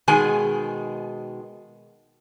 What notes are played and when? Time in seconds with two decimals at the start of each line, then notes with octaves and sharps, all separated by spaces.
0.08 B2 D#3 G#3 G#4 G#5